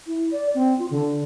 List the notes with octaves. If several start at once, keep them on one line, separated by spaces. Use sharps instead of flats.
E4
D5
C4
F4
D3